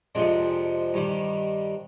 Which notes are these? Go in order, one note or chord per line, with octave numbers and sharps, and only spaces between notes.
F2 C3 F3 G#3 C4 D4
G2 D#3 G3